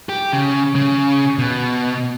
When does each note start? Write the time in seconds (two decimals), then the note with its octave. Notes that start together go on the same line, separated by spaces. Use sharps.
0.09 G4
0.33 C#3
0.76 C#3
1.38 B2